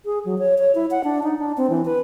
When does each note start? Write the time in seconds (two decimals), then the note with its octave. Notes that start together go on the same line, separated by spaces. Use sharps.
0.05 G#4
0.25 F#3
0.39 C#5
0.58 C#5
0.75 E4
0.91 F#5
1.04 D4
1.23 D#4
1.38 D4
1.57 C4
1.70 E3
1.85 B4